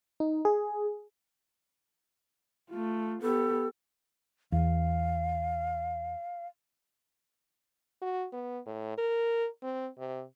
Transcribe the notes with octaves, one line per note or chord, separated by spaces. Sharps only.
D#4
G#4
A3 F4
B3 G4 A4
E2 F5
F#4
B3
A2
A#4
C4
C3